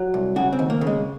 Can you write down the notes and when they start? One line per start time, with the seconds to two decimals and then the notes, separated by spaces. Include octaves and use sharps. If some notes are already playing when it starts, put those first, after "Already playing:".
Already playing: F#3
0.14 C2
0.36 C#3 F#4
0.52 C4
0.59 D#2
0.70 A#3
0.81 C#3
0.87 G#3